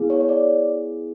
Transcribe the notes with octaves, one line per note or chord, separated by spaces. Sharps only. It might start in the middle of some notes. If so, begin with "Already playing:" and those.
Already playing: B3 E4 G#4
C#5
C#5
D5